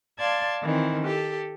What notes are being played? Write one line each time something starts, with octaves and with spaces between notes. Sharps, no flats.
D5 F5 A5 C6 G#6
D#3 E3 C4
G4 A4